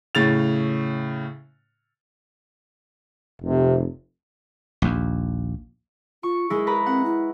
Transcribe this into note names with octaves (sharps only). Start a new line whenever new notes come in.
A2 C#3 A6 F7
F1 C3
A#1 D#2
F4 C#6
G#3 E4 G#4
B4 A#5 B5
C4 F#5
E4